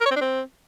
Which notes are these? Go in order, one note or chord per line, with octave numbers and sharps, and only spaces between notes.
A#4
C#5
C4
D4
C4